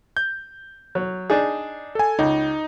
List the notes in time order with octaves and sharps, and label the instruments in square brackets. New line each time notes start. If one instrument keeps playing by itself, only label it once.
[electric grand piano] G6
[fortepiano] F#3
D4 D#4 G#4
[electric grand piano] A4 G#5
[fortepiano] C#2 [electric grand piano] D#4